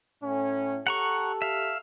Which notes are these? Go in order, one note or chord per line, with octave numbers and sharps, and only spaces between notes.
A2 C#4
G4 A4 F#5 A#5 C#6
E5 F5